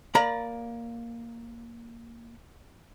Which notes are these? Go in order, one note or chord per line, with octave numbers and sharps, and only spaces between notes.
A#3 D5 A#5 B5